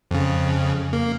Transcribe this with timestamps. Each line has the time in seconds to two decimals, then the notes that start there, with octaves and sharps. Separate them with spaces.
0.11 F2 C#3
0.93 A#3